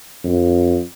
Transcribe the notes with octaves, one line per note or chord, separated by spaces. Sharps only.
F2